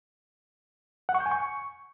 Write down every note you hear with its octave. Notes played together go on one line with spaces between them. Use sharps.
F#5
C#6
G6
G#5
C#6